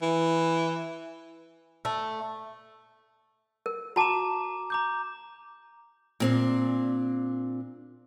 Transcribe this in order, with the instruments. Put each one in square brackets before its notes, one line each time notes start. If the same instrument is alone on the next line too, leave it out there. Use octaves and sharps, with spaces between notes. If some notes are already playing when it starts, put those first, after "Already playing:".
[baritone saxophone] E3
[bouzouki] A3
[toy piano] A#4
[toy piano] F#4 A5 [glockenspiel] A#5 D6 E7
[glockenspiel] A#5 D6 G6
[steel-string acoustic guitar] A#2 C4 D4